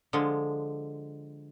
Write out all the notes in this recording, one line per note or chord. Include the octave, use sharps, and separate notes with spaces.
D3 F3 G#3